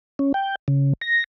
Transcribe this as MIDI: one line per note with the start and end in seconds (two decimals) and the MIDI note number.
0.19 0.32 61
0.34 0.55 79
0.68 0.93 49
1.01 1.24 94